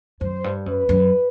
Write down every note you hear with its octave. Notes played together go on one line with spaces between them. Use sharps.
F#2 C5
G2
F#2 B4
F#2